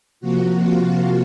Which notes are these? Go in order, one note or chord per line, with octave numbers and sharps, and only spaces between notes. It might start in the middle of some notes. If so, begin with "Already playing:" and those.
C3 F3 A#3 F#4
F4